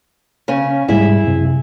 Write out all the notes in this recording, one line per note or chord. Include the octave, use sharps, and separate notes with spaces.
C#3 C#4
C2 G#2 G3 E4 G#4 E5
F#2 C3